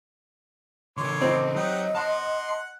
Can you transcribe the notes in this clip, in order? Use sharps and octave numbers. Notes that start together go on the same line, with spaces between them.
C#3 E3 C#5 C6 D6
C4 D#5
F#3 D#4 G4 F#5
F#5 A5 C6